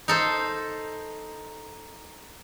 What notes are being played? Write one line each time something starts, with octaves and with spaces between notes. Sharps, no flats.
D#4 A4 C5